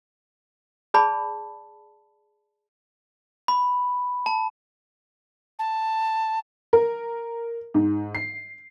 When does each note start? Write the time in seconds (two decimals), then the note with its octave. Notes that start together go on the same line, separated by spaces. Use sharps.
0.94 G#4 D5 A5 B5
3.48 B5
4.26 A5
5.59 A5
6.73 A#4
7.74 G#2
8.15 C7